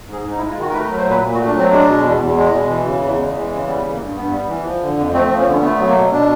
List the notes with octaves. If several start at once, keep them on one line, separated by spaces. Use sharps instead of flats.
G#2 G#4
G#2
D#4
E4
G#3
F4
D#3 F#4
A#4
A3 B4
A#4
F#3
C5
A#2 B4
A#2
F#4
A3
D4
F#3 C4
G#3 D4
B2
E2
E2
G#3
B2
E3
C#3
E2
G#3
E3
C#3
G3 B3
E3
A#3
G2
G2 B3
G3
E3
F3
D3
F2
A3 C4
C4
F3
C#4
D3 B3
A3 B3
B3
F#3
A#3
B2
B2 D4